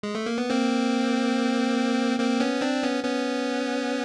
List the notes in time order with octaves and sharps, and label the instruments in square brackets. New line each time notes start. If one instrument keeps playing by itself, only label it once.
[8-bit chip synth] G#3
A3
A#3
B3
A#3 C4
A#3 C4
B3 C#4
C4 D4
B3 C#4
B3 C#4